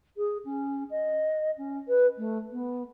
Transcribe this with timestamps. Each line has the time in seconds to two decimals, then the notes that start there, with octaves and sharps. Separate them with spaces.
0.17 G#4
0.45 C#4
0.90 D#5
1.58 C#4
1.88 B4
2.17 A3
2.51 B3